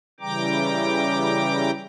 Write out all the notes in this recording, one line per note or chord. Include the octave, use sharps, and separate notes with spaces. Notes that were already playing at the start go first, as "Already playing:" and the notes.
C#3 E3 G3 G5 A#5 D6